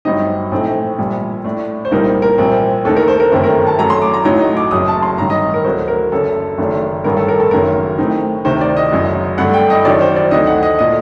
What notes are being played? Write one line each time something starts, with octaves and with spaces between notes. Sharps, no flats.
G1 G2 F#3 C4 D#4 D#5
A#1 A2 A3 C4 D#4
A#1 A#2 G3
A2 A3 D4
C5
C2 A#2 G3 C4 D#4 A#4
A#4
A#1 A#2 G3 C4
D#2 D3 A3 D#4 A4
A#4
C5
A#4
G1 F#2 D#3 A3 C4 A#4
A#4
A5
F#2 F#3 A3 A#5
C6
D6
A#5
A1 A2 F#3 A3 D#4 A#5
D#5
D6
F#1 F#2 F#3 D#6
A5
C6
A1 G2 D#3 A#5
D#5
A#4
D2 D3 F#3 C5
A#4
F#1 F#2 D3 A4
F#1 F#2 D#3 A3 D4
A1 G2 D#3 A#4
A4
A#4
A4
F#1 F#2 D#3 F#3 A#4
A2 A3 C4 D#4
D2 C3 D#3 C5
D5
D#5
F#1 F#2 F#3
G2 D3 A3 D4 F#5
G5
D#5
F#2 D#3 F#3 D5
C5
D5
D2 D3 A3 C4 D#4 D#5
F#5
D#5
A#2 A3 D4 D#5